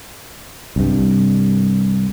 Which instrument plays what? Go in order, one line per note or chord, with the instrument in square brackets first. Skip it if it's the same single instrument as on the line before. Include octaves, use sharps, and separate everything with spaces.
[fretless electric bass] C2 G2